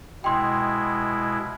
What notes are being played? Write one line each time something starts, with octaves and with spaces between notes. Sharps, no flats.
B2 G#3 E4 G5 C6